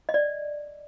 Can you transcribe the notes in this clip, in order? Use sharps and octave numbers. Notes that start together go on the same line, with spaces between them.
D#5
D5